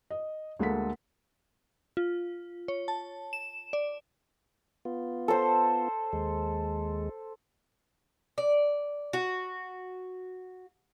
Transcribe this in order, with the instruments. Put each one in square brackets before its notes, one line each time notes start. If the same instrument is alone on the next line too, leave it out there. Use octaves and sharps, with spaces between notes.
[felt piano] D#5
D2 G#3 A#3 A4 F#5 B6
[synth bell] F4
C#5
A5
E7
D5
[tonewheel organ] B3 F4
[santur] A4 C5
[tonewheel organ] D#2 G#3
[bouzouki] D5
F#4